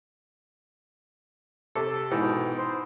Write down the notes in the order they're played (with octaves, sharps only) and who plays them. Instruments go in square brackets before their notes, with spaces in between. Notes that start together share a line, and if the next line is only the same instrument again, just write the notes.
[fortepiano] C3 A4
[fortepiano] G#2 E3 [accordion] B2 G5
[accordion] C5